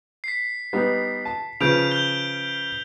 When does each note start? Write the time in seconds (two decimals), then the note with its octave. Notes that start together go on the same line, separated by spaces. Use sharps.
0.24 B6 C7
0.73 G3 B3 D#4
1.25 A5
1.61 C#3 F3 B4 G6 D7 F7
1.91 G6 G7